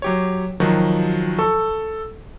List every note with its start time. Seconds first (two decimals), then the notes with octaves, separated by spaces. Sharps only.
0.02 F#3 G4 C#5
0.60 D#3 F3 F#3 F#4
1.39 A4 C#6